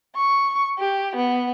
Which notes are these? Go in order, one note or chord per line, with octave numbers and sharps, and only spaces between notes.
C#6
G4
B3